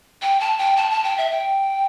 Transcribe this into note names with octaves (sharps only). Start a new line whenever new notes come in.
G5
A5
G5
A5
A5
G5
E5
G5